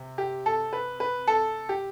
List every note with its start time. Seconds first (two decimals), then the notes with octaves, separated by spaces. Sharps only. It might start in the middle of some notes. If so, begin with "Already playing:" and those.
Already playing: C3
0.18 G4
0.46 A4
0.73 B4
1.00 B4
1.28 A4
1.69 G4